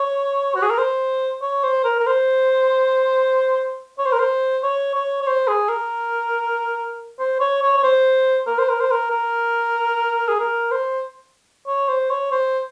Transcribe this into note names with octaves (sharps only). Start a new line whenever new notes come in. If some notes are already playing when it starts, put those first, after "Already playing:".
Already playing: C#5
F#4
G#4
A#4
C5
C#5
C5
A#4
A#4
C5
C#5
C5
A#4
C5
C#5
C#5
C#5
C5
G#4
A#4
C5
C#5
C#5
C#5
C5
A#4
C5
A#4
C5
A#4
A#4
G#4
A#4
C5
C#5
C5
C#5
C5